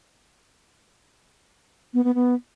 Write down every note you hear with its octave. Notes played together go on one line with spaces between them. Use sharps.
B3
B3
B3